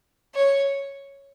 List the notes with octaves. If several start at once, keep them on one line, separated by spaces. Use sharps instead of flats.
C#5